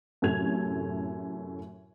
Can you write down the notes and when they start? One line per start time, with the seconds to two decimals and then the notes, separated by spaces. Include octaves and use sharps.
0.22 F#2 A2 C3 A3 G#6 F7